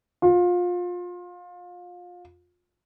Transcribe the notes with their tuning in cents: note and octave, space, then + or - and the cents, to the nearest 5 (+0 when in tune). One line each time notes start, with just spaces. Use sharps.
F4 +25